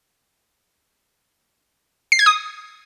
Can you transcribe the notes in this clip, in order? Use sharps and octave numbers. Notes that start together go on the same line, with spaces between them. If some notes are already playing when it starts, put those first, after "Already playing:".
C7
G#6
D#6